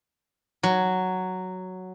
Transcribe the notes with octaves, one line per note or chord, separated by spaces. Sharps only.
F#3